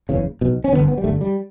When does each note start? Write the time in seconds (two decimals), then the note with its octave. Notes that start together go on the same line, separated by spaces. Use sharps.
0.09 F#1 E2 C#3
0.41 B1 B2
0.64 C#4
0.72 G2 D3 B3
0.77 G1
0.88 B3
0.98 G3
1.04 G1 G2 D3 A3
1.21 G3